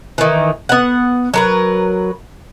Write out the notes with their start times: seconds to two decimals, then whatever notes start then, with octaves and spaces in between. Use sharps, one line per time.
0.18 D#3 E3
0.69 B3 F#5
1.34 F#3 A#4 B4